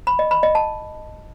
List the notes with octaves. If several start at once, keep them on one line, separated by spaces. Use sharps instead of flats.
B5
D#5
B5
D#5
A5